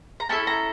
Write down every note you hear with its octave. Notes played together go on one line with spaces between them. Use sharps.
A#5
C#4 E4 A4 A5
A#5